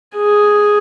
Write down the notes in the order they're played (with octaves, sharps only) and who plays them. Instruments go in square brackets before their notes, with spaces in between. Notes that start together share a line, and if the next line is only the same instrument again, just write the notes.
[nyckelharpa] G#4